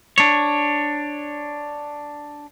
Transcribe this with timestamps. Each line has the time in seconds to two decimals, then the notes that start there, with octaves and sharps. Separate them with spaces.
0.18 D4 C#5